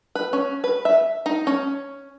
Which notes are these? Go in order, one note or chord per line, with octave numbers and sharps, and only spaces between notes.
B4
C#4
B4
E5
D#4
C#4